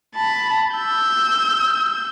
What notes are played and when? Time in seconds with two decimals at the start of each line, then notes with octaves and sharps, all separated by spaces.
0.16 A5 B5
0.75 E6 G6